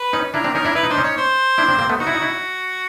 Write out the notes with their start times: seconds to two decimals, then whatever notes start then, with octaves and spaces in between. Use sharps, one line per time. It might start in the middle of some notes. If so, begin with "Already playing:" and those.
Already playing: B4
0.13 C#4 D#4
0.34 D4 E4 A#4
0.44 C4 D4
0.55 C#4 D#4 A#4
0.65 D4 E4
0.75 E4 B4
0.83 D#4
0.89 D4 C5
0.98 C#4 D#4
1.03 C#5
1.17 C5
1.58 D4 E4
1.68 C4 D4
1.79 A#3 C4
1.89 A3 B3
2.00 D#4 F#4
2.07 E4
2.15 D#4
2.22 E4